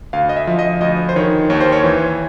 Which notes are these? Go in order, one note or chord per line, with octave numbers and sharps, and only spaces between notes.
D2 F5
D#5
E5
F3
D#5
D2 D#5
C5
D#3 C#5
D#2 C#5
C5
C#5
E3